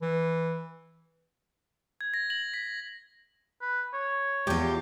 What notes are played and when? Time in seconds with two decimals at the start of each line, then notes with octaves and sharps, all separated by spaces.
0.02 E3
2.01 G#6
2.14 A#6
2.30 F#7
2.54 B6
3.61 B4
3.94 C#5
4.47 E2 F4 G4